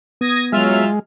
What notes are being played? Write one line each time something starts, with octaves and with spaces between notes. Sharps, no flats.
B3 D#6 G#6 A#6
F#3 G#3 F4 E5 F6